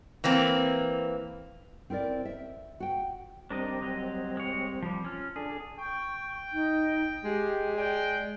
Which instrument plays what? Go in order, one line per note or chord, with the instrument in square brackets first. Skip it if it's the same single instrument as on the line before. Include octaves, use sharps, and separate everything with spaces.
[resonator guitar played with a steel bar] E3 A#3 C4
[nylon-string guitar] C4 E4 A#4 D5
E5
F#4 G5
[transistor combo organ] G3 C4 [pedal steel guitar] D4 A#4 D#5
[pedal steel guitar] F#3 D#5
G#3 C#5
F3 G3
C#4 F4 F6
[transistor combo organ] D4 A4 [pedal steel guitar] G#4
[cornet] G5 [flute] C#6
[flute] D#4
[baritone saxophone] G#3 [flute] G4
[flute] D5 [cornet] G5